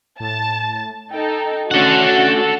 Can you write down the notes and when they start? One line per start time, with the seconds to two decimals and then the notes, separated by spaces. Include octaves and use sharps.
0.20 A2 A5
1.11 D#4 A4 G5
1.71 A3 C#4 D4 F#4 A4 F#5